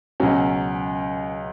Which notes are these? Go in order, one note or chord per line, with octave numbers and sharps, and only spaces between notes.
C#2 B2 F#3 C#4